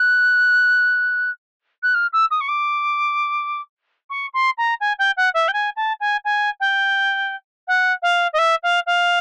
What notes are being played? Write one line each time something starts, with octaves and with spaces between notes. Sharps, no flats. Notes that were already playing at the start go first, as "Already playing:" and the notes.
Already playing: F#6
F#6
F6
E6
D#6
C#6
D6
C#6
C6
A#5
G#5
G5
F#5
E5
G5
G#5
A5
G#5
G#5
G5
F#5
F5
D#5
E5
F5
F5